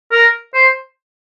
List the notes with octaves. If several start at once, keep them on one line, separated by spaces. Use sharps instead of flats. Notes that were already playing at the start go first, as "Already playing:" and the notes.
A#4
C5